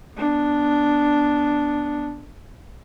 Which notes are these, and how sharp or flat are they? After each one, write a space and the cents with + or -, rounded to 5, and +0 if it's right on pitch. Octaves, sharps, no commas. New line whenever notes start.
B3 +0 D4 +0